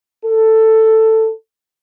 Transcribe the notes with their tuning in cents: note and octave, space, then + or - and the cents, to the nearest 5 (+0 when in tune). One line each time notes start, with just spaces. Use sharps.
A4 +10